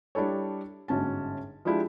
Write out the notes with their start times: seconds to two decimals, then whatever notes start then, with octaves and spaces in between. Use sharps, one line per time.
0.15 G3 D4 E4 A4 C#5
0.88 G1 G#2 C#4 F#4 A5
1.65 F3 G#3 D4 E4 G4